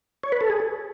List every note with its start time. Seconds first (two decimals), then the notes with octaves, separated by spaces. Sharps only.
0.23 C#5
0.32 B4
0.41 A4
0.50 G#4